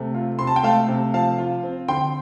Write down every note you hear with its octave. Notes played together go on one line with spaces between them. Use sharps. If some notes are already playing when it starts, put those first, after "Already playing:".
Already playing: C3 A3
F4
C3 C6
A5
G5
A3 F5 A5
C3
F3 F5 A5
F4
C4
D3 G5 C6